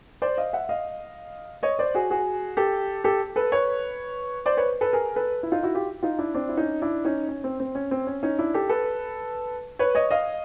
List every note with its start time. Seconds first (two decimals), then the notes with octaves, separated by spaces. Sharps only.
0.22 C5 D5
0.38 D#5 F5
0.53 E5 F#5
0.69 D#5 F5
1.63 C#5 D#5
1.79 C5 D5
1.95 F#4 G#4
2.10 F#4 G#4
2.57 G4 A4
3.04 G4 A4
3.36 A4 B4
3.52 B4 C#5
4.46 C5 D5
4.57 B4 C#5
4.81 A4 B4
4.93 G#4 A#4
5.16 A4 B4
5.43 E4
5.52 D#4 F4
5.63 E4 F#4
5.75 F4 G4
6.03 D#4 F4
6.18 D4 E4
6.35 C4 D4
6.49 E4
6.57 C#4 D#4
6.82 D4 E4
7.05 C#4 D#4
7.28 C#4
7.44 C4
7.60 C4
7.75 C#4
7.91 C4
8.07 C#4
8.23 C#4 D#4
8.39 D4 E4
8.54 G4 A4
8.69 A4 B4
9.79 B4 C#5
9.95 C#5 D#5
10.11 D#5 F5